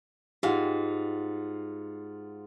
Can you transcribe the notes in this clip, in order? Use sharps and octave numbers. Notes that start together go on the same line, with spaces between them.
G#2 F4 G4 F5 F#5